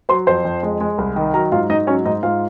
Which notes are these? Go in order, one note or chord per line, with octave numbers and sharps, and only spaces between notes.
F#3 C5 C6
F2 C5 C6
F2
G#3
G#3
C2
D#3
F#3 A#4 A#5
G#2 F4 F5
G#2 D#4 D#5
F#3 C#4 C#5
G#2 D#4 D#5
G#2 F4 F5